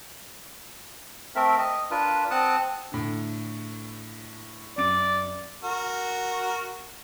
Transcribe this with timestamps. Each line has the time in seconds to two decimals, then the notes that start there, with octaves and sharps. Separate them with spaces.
1.35 A3 C4 A#4 E5
1.58 D#5
1.91 D4 F4 A#4 B4
2.31 C4 F#5 A5 D#6
2.92 A2 D3
4.78 F#2 D5 D7
5.63 F#4 A#4